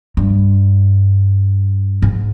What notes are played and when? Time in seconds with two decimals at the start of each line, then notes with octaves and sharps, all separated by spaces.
0.17 G2
2.02 G#2